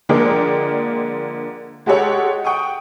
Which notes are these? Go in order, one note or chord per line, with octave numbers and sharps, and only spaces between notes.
D3 F3 G#3 A#3 D4 G5
G#3 F#4 G4 A4 C#5 F#5
F#5 G5 C#6 D#6